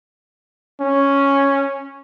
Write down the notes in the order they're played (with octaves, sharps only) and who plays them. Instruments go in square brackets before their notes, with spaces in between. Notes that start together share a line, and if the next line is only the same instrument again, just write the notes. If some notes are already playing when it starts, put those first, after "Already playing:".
[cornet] C#4